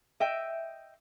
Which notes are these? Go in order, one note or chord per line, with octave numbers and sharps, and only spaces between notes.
D#5 E5 G5